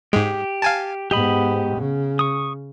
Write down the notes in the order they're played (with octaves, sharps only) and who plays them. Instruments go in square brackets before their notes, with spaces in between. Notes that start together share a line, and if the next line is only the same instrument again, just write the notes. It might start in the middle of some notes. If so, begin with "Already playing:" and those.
[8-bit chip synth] G#2 G#3 [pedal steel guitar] G4
[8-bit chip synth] F5 G#5 A5
[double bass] G#2 B3 [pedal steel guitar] G4 D#5 B5
[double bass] C#3
[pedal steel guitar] C#6 D#6